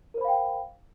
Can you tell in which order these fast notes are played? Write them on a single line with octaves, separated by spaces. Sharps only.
A#4 C5 B5 F5 G5